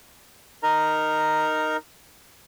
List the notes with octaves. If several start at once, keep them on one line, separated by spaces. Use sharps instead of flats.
D#4 A#4 A#5